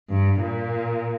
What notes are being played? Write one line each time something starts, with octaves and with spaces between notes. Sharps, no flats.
G2
A#2